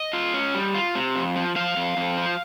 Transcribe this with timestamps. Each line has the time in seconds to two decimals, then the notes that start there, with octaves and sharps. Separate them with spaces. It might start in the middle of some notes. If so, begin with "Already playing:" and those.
Already playing: D#5
0.13 F4
0.34 C#4
0.54 G3
0.75 F4
0.95 C3
1.16 F2
1.36 F3
1.56 F3 F5
1.76 F2
1.97 F2
2.18 F3